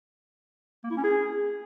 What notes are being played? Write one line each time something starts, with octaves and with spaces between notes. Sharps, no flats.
A#3
E4
C#4
G#4